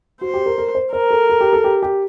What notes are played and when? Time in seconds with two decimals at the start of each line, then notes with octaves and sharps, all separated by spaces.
0.21 F#4 C5
0.34 G4
0.46 A#4
0.58 A#4
0.75 C5
0.93 A#4 C5
1.11 A4
1.30 A4
1.41 G4
1.53 A4
1.64 G4
1.83 G4